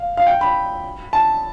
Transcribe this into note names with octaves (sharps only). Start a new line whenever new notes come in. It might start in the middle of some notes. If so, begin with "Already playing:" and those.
Already playing: F5
F5
G5
B5
A5